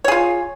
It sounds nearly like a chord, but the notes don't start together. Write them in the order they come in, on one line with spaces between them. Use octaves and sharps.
C#5 G#4 F4